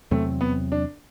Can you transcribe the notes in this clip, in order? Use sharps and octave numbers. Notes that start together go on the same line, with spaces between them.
E2 C3 F#3 A3 C4
B3
D4